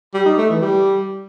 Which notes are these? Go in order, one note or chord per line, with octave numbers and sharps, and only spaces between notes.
G3
D#4
A3
E3
G3